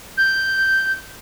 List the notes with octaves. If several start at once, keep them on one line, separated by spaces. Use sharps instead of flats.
G6